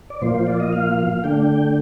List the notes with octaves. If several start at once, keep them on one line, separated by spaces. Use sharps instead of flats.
D5
A#2 F3 A#3 F4 C5
C5
D5
D#5
F5
D3 A3 D4 G5